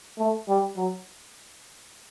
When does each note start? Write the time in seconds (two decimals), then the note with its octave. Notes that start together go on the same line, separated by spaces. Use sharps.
0.18 A3
0.48 G3
0.77 F#3